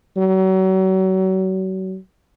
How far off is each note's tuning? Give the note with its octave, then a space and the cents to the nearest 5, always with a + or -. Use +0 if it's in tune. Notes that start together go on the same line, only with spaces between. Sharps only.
F#3 +35